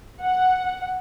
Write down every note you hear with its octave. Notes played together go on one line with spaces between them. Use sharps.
F#5